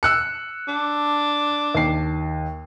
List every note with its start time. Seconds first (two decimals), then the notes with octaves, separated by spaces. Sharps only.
0.03 E6 F#6 C#7
0.68 D4
1.75 D#2 C7